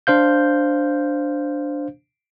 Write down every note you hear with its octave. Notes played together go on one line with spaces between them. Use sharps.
D4 C5 F5 G6